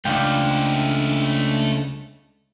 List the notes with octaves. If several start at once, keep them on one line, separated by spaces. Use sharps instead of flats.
C#2 A3 D4 C5 F5 G5